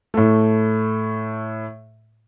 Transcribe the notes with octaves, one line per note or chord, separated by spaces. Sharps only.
A2 A3